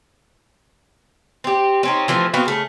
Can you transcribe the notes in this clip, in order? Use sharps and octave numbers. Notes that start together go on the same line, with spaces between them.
C4 G4
C4 C#4 D#4
E3 F3 A3 C4
B3 C4 F#4 F5
C#3 A3